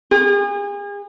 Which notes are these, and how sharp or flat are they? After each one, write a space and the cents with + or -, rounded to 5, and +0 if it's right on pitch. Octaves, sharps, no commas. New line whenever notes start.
G#4 -40